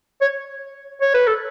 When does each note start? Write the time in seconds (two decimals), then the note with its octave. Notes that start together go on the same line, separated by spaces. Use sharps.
0.21 C#5
1.01 C#5
1.14 B4
1.27 A4